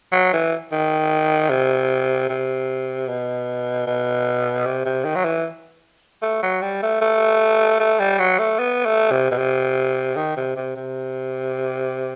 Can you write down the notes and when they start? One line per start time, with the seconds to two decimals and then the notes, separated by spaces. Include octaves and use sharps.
0.12 F#3
0.33 E3
0.72 D#3
1.50 C3
2.29 C3
3.08 B2
3.86 B2
4.65 C3
4.85 C3
5.04 D#3
5.15 F#3
5.24 E3
6.22 A3
6.43 F#3
6.62 G3
6.82 A3
7.01 A3
7.80 A3
7.99 G3
8.19 F#3
8.39 A3
8.59 B3
8.85 A3
9.11 C3
9.31 B2
9.38 C3
10.16 D#3
10.37 C3
10.56 C3
10.76 C3